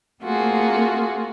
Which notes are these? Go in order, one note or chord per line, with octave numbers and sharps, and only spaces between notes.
A3 A#3 C4 F4 F#4 G#4